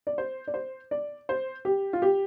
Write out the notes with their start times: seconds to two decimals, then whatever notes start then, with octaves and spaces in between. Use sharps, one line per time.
0.07 D5
0.18 C5
0.48 D5
0.54 C5
0.91 D5
1.29 C5
1.65 G4
1.93 F4
2.02 G4